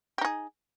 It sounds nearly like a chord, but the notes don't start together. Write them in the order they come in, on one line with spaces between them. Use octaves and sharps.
G4 D#4 G#4